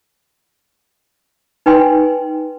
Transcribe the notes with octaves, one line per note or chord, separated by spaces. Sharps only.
D#4 B4 G5 G#5 C6